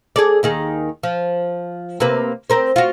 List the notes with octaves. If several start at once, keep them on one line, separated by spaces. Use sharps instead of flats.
G#4 A4 D5
D#2 D#3 G#4
F3
C3 A#3 B4
C4 A#4 C5
F4 F#4